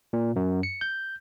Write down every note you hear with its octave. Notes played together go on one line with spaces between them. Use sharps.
A#2
F#2
C#7
G6